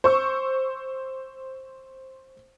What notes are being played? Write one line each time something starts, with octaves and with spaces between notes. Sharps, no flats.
C5 C#6 E6